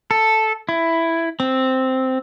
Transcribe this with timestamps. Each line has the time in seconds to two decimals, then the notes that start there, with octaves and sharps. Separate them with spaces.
0.11 A4
0.69 E4
1.40 C4